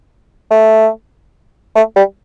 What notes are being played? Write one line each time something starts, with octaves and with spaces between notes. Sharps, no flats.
A3
A3
G3